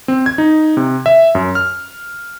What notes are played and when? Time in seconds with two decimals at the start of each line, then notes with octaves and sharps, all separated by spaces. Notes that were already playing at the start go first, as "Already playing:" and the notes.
0.08 C4
0.26 G#6
0.38 D#4
0.77 C3
1.06 E5
1.35 F#2
1.55 F6